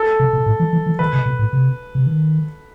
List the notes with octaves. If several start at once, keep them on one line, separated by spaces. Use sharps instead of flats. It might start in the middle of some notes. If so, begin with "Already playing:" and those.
Already playing: A4
C3
B2
A2
E3
E3
E3
D#3 B4
C3
B2
A2
C3
C3
D#3